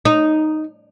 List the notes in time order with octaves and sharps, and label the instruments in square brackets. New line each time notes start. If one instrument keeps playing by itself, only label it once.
[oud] D#4